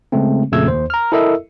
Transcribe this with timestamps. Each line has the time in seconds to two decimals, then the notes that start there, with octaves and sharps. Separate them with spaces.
0.12 C#3 G#3 A3 C4
0.52 F2 A#2 C#3 A3 E6 G#6
0.68 D#2 C5
0.90 A#5 F6
1.12 E4 A4 A#4 D#5 E5 E6